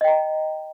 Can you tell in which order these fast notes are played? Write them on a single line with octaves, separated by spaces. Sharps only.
D#5 G5 A#5